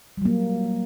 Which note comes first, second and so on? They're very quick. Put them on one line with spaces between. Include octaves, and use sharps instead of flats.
G3 F#3 A#3